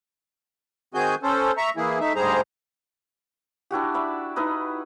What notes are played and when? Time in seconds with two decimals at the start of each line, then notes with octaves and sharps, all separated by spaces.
0.94 D#3 C4 F#4 G#4 G#5 G6
1.23 C#4 A4 C5
1.57 E5 A#5 C#6
1.77 E3 A#3 E4 G#4
2.00 A3 D#4 E5
2.15 D2 G#2 G3 G#4 C5 A#5
3.71 D4 E4 F#4 G4
3.94 D5 E5 B5
4.36 D#4 E4 B4 D#5